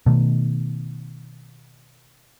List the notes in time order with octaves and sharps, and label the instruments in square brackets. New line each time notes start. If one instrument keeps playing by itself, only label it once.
[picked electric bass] B2 D#3 A3